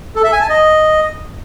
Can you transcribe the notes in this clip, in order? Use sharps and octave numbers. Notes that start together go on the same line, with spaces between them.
A4
E5
G#5
A5
D#5